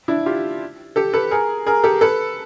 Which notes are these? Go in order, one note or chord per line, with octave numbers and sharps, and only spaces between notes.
D4 E4
F4 G4
G4 A4
A4 B4
G#4 A#4
G#4 A#4
G4 A4
A4 B4